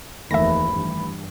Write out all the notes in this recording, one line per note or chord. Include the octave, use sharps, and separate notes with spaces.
F1 D#2 D#3 E3 A3 E5 B5 A#6
G2